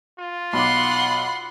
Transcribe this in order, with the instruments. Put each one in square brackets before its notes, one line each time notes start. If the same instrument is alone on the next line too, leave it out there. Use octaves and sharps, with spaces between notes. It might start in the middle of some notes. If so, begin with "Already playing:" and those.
[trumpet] F4
[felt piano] B1 D6 [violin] F#5 C6 [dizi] B5